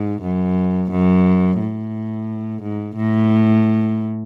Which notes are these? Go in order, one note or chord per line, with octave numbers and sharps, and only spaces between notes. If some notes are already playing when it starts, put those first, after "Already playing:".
Already playing: G#2
F#2
F#2
A2
G#2
A2